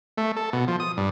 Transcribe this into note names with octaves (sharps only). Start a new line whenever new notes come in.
A3
A4
B2
F3
D#6
G2